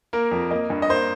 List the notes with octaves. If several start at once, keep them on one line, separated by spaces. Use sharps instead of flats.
A#3 A#4
F2
A#3 D#5
G2
D#5
A#3 C5